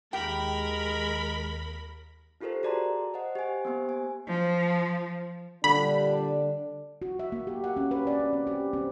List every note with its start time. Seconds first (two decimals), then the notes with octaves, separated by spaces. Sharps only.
0.13 D#2 G#3 G4 A#4 G5 B5 A#6
2.41 D#4 F4 G4 A4 A#4 C5
2.63 F#4 G#4 D5 A5 A#5 C6
3.14 C5 D#5 F#5
3.35 G4 C5 G#5
3.65 A#3 B3 G4 C5
3.89 G#5
4.28 F3
5.64 A#2 D3 G3 D4 B5
7.02 F#4
7.19 E5
7.32 A#3
7.47 G4
7.64 F#5
7.77 C#4
7.91 B4
8.07 D5
8.20 C#4
8.33 C4
8.47 G4
8.73 C4